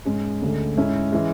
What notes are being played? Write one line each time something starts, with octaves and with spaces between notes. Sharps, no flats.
G#2 G#3 C#4
D2 D3 G#3
G#2 G#3 C#4 E4
E3 G#3